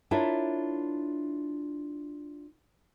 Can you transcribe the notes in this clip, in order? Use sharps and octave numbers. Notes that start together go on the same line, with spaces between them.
D4 E4 F4 A#4 C#5 E5